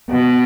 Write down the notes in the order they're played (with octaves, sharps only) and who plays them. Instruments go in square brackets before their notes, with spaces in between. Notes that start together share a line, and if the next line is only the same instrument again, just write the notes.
[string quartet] B2